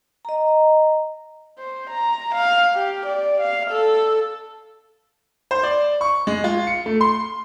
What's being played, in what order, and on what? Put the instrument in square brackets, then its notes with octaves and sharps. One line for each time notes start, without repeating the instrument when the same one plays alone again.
[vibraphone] D#5 A#5
[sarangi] C5
A#5
F5
G4
D5
F5
A4
[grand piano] C5
D5
C#6
G#3
F4
C#7
A3
C6